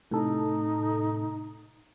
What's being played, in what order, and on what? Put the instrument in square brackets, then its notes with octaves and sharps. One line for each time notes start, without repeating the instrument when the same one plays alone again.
[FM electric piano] A2 C3 A4 [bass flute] D#4